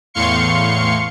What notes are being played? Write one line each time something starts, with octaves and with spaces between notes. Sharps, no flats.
E2 A2 F5 C6 C#6 C#7